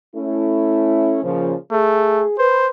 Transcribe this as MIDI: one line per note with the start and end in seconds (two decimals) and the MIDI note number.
0.16 1.19 57
0.16 1.19 61
0.16 1.19 64
1.23 1.53 46
1.23 1.53 49
1.23 1.53 53
1.72 2.25 57
1.72 2.34 68
2.39 2.70 71
2.39 2.69 72